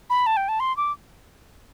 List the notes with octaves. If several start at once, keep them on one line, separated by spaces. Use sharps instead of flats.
B5
A5
G5
A5
C6
D6